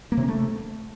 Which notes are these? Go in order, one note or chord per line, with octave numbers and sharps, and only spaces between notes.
A#3
C3
C#4
A3